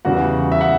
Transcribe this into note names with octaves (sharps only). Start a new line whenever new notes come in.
E2 C#3 E3 G3 F#4 F#5
E5
F#5